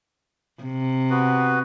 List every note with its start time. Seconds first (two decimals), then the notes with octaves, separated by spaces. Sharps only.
0.63 C3
1.10 B3 F#4 B4